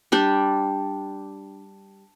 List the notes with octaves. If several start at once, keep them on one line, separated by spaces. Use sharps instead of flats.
G3 D4 G4